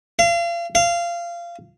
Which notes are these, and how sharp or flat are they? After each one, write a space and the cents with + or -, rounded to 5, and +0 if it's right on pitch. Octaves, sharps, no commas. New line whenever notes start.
F5 -35
F5 -20